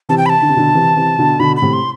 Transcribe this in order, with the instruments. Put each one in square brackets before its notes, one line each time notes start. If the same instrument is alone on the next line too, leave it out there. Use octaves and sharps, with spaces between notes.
[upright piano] C3 E3 [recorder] A5
[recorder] G5
B5
A5
[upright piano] D3
C3
B2 D3
C3 E3
C3 E3
B2 D3
[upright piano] B2 D3 [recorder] B5
[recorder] B5
[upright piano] A2 C3
[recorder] C6